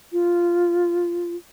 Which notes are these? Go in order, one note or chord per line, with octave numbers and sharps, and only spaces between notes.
F4